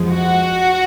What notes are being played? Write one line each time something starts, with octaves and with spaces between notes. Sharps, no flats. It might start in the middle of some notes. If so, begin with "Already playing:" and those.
Already playing: F2 F3 G#3
F#4